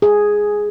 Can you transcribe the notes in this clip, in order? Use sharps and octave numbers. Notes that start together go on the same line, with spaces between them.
G#4